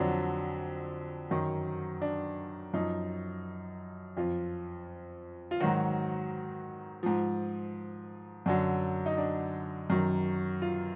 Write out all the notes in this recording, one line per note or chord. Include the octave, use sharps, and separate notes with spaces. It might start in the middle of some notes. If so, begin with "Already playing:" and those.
Already playing: F2 D3 F#3 D4
F#2 D#3 F#3
D4
F#2 F3 D#4
F2 F3 F4
F4
G#2 D#3 F#3 F#4
G#2 F3
F#2 D3 F#3
D#4
D4
F#2 D#3 F#3
F4